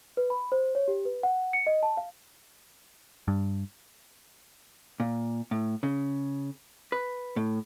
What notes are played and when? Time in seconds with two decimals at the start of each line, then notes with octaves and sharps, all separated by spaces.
0.17 B4
0.30 B5
0.52 C5
0.75 C#5
0.88 G4
1.05 B4
1.23 F#5
1.53 C#7
1.67 D#5
1.83 A5
1.97 F5
3.28 G2
5.00 A#2
5.51 A2
5.83 C#3
6.92 B4
7.36 A2